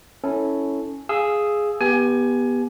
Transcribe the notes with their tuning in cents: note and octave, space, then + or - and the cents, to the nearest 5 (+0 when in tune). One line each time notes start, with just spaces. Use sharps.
C#4 +0 E4 -20 A4 +0
G#4 +0 F5 +0 E6 +0
B3 -15 G4 +15 G#5 +20